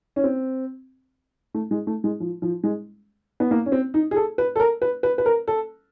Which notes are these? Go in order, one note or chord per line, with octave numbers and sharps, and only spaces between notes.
C#4
C4
A3
G#3
A3
G#3
F3
F3
G#3
B3
A#3
C#4
C4
D#4
G#4
A4
B4
A4
A#4
B4
B4
B4
A#4
A4